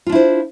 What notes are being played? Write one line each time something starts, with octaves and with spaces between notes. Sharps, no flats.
D4 E4 F4 C5